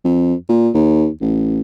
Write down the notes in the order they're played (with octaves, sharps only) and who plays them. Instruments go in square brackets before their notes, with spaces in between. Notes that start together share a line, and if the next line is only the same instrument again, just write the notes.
[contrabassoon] F2
A#2
D#2
A1